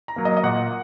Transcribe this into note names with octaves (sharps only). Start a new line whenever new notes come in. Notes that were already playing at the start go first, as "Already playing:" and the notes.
A#5
F#3 A#3
D#5
D#5
A#2 F#5